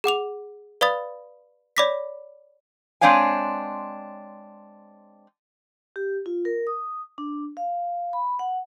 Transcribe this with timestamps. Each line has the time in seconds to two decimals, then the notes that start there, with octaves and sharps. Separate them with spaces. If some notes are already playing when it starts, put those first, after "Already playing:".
0.04 G#4 F#5 D6 F7
0.81 B4 D5 F5 B5 D#6 A6
1.77 C#5 D5 B5 D6 A#6 B6
3.01 G#3 C4 D4 C#5 F5 G#5
5.96 G4
6.26 F4
6.45 A#4
6.67 D#6
7.18 D4
7.57 F5
8.13 B5
8.39 F#5